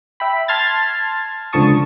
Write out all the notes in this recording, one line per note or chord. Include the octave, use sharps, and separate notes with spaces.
E5 G5 B5
A5 C6 F6 G#6 A6
C#2 D3 F3 A5 C#6 D#6